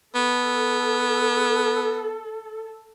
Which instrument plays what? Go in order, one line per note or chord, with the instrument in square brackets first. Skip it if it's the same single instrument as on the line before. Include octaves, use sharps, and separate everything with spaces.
[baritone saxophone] B3 [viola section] A4